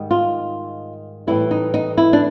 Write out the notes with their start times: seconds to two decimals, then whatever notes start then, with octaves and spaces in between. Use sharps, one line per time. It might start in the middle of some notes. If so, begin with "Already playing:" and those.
Already playing: G#2 D#3 G3
0.11 F4
1.27 A2 E3 G3 E4
1.51 D#4
1.74 D#4
1.98 E4
2.13 D4